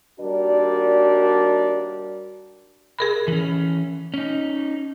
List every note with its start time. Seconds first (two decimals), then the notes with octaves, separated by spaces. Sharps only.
0.20 D#2 G3 D4 F#4 A#4 D5
2.99 G#4 A#4 B5
3.28 E3 C#4
4.14 C#4 D#4